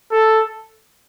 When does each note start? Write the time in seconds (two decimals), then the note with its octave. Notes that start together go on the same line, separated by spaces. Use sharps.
0.12 A4